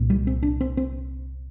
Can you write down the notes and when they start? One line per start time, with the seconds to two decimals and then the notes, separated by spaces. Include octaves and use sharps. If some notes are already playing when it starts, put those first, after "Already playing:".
Already playing: C2 A#2
0.10 G3
0.27 C4
0.43 D4
0.61 C4
0.77 C4